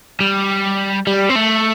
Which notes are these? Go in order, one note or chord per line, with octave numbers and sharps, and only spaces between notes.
G3
G3
C4
A3